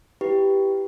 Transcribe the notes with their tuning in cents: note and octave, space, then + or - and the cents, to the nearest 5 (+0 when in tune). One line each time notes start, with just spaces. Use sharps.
E4 +0 G4 +0 B4 +0